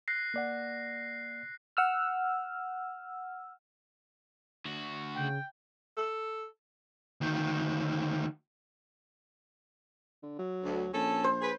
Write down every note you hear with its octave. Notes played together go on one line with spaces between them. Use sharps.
F#6 A#6 C7
A#3 D5 F#5
F#5 E6 F6
D2 F#4
C#3 G5
A4
D2 D#3
D3
F#3
D2
A#1 C#4 A4
C5
G#4 B4